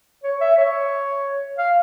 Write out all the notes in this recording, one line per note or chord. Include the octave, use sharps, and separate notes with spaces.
C#5
E5
C#5
F5